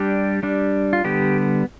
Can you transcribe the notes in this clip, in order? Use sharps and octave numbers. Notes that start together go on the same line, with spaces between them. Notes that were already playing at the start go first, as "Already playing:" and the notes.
Already playing: G3 D4 G4
G3 D4
F4
D3 G3 B3 G4